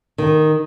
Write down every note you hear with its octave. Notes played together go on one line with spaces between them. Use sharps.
D#3